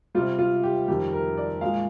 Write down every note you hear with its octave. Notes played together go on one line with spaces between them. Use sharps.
C3 G3 F4
F4
G4
F2 D#3 G3 G4
A#4
D5
A#2 G#3 F5